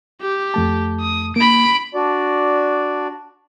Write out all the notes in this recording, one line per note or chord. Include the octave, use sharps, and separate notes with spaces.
G4
F2 A3 A5
D#6
A#3 B5 D7
D4 F#4 D5